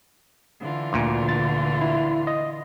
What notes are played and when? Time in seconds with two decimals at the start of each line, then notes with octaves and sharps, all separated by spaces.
0.62 D3 E3 F4
0.93 D2 A#2
1.29 A6
1.82 E4
2.27 D#5